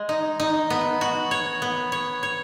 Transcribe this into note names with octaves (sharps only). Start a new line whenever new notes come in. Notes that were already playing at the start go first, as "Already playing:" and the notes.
Already playing: G#3
D#4
D#4
B3
F#4
C#5
B3
C#5
C#5